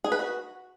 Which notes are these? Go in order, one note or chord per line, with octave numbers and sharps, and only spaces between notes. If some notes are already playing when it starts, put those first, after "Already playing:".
G#4
B4
F#4